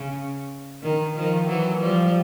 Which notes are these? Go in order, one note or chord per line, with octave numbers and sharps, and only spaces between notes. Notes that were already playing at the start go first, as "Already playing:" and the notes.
Already playing: C#3
D#3
D#3 F3
E3 F#3
F3 G3